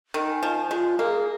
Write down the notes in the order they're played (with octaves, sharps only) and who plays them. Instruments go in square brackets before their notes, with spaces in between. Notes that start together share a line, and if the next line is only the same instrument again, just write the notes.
[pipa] D#3
[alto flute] G#5
[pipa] F3
[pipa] G#3 [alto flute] F4
[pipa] A#3 [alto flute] G#4